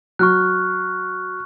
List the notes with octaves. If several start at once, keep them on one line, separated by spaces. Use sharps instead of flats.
F#3 C#6 F6 F#6